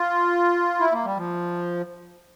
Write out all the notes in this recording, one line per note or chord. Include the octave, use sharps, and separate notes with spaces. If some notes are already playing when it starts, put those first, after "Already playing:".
Already playing: F4
E4
A#3
G3
F3